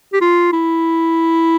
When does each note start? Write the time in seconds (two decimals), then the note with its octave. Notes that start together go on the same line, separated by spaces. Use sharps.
0.13 G4
0.21 F4
0.53 E4